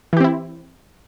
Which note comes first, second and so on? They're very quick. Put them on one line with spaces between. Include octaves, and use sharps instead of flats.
E3 G4 C4 E4